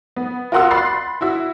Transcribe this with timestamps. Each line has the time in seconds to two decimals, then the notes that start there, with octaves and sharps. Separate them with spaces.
0.16 B3
0.52 F4 F#4 A#4 F#5 C6 E6
0.71 B5 C6 F#6 A6 C7
1.21 E4 F#4 E5